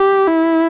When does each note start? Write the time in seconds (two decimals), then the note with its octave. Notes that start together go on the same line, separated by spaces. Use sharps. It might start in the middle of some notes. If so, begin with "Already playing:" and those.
Already playing: G4
0.28 E4